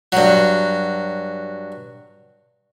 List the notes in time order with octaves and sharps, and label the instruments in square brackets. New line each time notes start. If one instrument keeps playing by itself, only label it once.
[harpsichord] G2 F#3